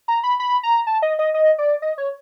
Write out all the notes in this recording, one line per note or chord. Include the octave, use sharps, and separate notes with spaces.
A#5
B5
B5
A#5
A5
D#5
D#5
D#5
D5
D#5
C#5